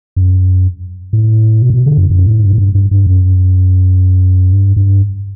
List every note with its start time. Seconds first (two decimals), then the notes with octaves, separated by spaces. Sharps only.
0.16 F#2
1.13 A2
1.62 B2
1.70 A2
1.74 B2
1.86 D3
1.98 F#2
2.10 F#2
2.26 A2
2.42 G2
2.53 A2
2.58 G2
2.75 G2
2.91 G2
3.07 F#2
4.53 G2
4.76 G2